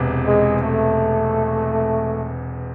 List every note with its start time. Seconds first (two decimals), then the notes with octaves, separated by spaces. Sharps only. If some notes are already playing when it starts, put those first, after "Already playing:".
Already playing: E1 E2 C3
0.25 G#3
0.62 A3